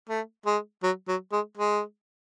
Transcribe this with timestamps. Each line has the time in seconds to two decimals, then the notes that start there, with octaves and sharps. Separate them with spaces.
0.09 A3
0.46 G#3
0.83 F#3
1.08 F#3
1.32 G#3
1.58 G#3